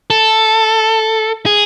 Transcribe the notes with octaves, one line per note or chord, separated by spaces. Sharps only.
A4
G#4